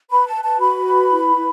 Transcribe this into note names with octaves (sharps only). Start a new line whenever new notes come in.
B4 B5
A5
B4
A5
F#4 B5
B4
E4
E4